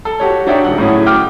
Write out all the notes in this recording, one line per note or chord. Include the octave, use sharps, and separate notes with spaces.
A4
F#4 G4 C#5
D4 D#4 C#5 E5 G5
D#1 F#5
A2 F#3 C#4 E4 G#4
G5 D6 F6